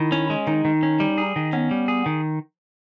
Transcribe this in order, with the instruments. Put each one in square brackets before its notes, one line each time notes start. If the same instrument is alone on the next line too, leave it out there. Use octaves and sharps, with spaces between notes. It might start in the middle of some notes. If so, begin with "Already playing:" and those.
Already playing: [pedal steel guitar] D#3 [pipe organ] E4
[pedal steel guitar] C#4
G#3
[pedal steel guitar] D#3 [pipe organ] D#4
[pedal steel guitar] D#3
C#4
G3
G#4
D#3
[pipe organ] B3 [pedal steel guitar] C#4
[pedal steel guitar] G3
G#4
D#3